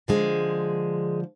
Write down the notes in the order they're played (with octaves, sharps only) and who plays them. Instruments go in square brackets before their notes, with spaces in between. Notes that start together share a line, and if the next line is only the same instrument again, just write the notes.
[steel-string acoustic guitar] D3 F3 G#3